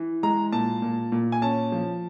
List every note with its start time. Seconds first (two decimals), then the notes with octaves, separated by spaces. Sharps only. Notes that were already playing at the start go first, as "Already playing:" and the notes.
Already playing: E3
0.23 G#3 A#5
0.52 A#2 A5
0.82 A#2
1.12 A#2
1.32 G#5
1.42 C#4 A5
1.72 F3